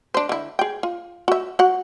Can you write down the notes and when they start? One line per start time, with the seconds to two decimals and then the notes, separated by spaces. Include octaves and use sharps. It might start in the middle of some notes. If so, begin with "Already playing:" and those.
0.14 D4 C5
0.29 D3 E4
0.59 G#4 G5
0.83 F4
1.28 F#4 E5
1.59 F#4 F#5